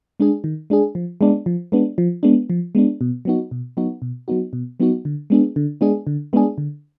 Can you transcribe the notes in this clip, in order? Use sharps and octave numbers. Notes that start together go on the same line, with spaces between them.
G#3 D4 G#4
D#3
G#3 D4 G#4
F3
G#3 B3 D4
F3
G#3 B3 D4
F3
G#3 B3 D4
F3
G#3 B3 D4
B2
F#3 B3 D#4 F#4
B2
F#3 B3 D#4 F#4
B2
F#3 B3 D#4 F#4
B2
F#3 B3 D#4 F#4
D3
G#3 B3 D4 G#4
D3
G#3 B3 D4 G#4
D3
G#3 B3 D4 G#4
D3